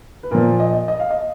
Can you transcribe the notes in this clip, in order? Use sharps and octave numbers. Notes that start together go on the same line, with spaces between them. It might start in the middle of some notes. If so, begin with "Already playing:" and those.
B4
A#2 F3 A#4
D#5
D#5
D#5
F5
D#5